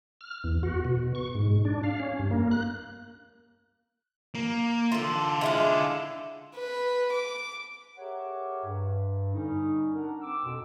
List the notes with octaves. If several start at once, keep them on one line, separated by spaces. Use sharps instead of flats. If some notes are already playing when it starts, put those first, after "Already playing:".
F6
E2
F#4
B2
C#6
G#2
D4
F5
C#4
G2
A#3
F#6
A#3
D3 F4 A4 C6
G#3 E4 F4
B4
D6
G4 G#4 A#4 C#5 E5 F#5
G2
D3 G3 C#4 D#4
D4 A#4 F#5
C4 D6 E6
F2 B2